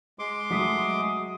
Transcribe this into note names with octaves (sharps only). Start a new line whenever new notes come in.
G#3 C6 D6
F#3 A3 D#6 B6